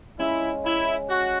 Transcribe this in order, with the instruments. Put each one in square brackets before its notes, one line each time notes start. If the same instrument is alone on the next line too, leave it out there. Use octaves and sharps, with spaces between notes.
[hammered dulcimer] G#3 C#4 F4 [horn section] E4
[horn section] E4
F#4